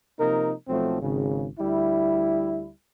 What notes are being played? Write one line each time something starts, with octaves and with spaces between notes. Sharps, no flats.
C3 F3 A#3 D#4 A#4
B1 F3 F#3 A3 C4
G#1 C#3
D2 G3 E4